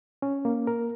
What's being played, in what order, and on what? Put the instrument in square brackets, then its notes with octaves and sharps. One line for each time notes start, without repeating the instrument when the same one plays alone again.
[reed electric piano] C#4
A#3
A#4